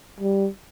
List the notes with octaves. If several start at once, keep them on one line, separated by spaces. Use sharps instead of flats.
G3